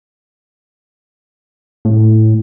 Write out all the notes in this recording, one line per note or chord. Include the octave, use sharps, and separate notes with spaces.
A2